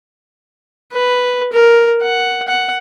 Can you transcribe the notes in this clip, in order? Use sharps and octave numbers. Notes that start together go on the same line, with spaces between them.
B4
A#4
F#5
F#5